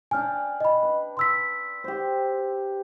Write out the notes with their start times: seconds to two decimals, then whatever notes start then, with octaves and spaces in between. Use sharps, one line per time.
0.11 D4 G5 G#5 F6
0.61 D#5 B5
0.83 B4
1.17 C6 E6 B6
1.84 G4 C5